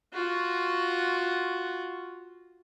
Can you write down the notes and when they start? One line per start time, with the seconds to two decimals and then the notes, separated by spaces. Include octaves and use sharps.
0.13 F4 F#4